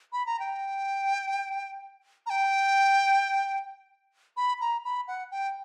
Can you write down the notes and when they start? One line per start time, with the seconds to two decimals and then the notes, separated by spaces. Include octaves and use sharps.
0.12 B5
0.26 A#5
0.39 G5
2.26 A#5
2.30 G5
4.37 B5
4.61 A#5
4.85 B5
5.08 F#5
5.31 G5